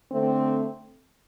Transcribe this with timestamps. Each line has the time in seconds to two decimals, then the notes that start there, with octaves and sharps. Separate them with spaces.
0.11 D3 A3 C4